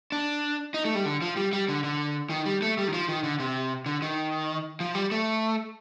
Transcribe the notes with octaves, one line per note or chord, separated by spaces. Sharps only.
D4
D#4
A3
G3
D3
F3
G3
G3
D3
D3
D#3
G3
A3
G3
D#3
F3
D#3
D3
C3
D3
D#3
F3
G3
A3